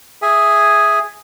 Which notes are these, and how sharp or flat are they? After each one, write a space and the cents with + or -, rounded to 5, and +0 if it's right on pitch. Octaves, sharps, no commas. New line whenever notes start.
G#4 +0 E5 +0 G#5 +0